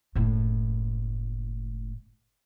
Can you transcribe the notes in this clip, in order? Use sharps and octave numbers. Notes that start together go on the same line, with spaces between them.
F#1 A2